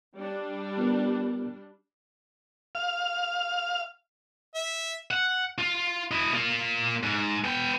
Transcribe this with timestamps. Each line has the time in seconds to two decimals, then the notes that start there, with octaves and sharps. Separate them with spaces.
0.17 G3 D4
0.77 B3 F4 A#4
2.75 F5
4.55 E5
5.11 F#5
5.58 F4
6.11 E4 D#5
6.33 A#3 F4
7.03 G#2
7.44 B3 G5